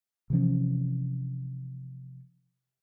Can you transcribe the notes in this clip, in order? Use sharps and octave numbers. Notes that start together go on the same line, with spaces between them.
C3 E3 F3 C#4